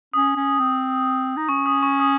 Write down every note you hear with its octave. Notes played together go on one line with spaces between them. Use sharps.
C#4 D#6
C#4
C4
D#4
C#4 C#6
D#6
C#6
D#6